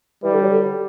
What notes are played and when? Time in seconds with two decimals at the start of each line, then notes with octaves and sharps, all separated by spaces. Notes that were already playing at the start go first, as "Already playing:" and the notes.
0.23 E3 G3
0.33 D3
0.42 F#3
0.52 D3